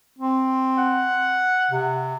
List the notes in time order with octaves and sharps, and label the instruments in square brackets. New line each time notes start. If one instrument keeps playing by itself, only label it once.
[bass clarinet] C4
[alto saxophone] F#5
[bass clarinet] C3